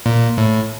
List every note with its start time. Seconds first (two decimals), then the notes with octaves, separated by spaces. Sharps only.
0.06 A#2
0.38 A2